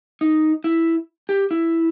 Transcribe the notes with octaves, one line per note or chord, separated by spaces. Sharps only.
D#4
E4
G4
E4